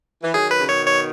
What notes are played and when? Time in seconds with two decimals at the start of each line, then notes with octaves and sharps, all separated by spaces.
0.23 E3
0.33 D#3 F#3 G#4
0.51 B4
0.59 C#3
0.68 B2 D#3 C#5
0.87 C#5